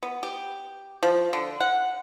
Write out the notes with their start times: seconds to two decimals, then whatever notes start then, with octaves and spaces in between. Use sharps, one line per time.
0.03 B3
0.23 G4
1.03 F3
1.33 D3
1.60 F#5